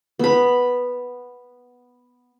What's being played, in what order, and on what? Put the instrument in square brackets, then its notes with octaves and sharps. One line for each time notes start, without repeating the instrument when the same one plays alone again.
[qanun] B3 B5